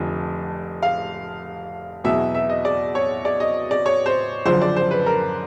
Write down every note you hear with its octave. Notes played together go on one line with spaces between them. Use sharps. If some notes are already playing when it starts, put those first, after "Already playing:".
Already playing: F1 F2 D3 F3
F5
E2 B2 F#3 E5
E5
D#5
D5
C#5
D5
D#5
D5
C#5
C5
F#1 F#2 D3 F3 C5
D5
C5
B4
A#4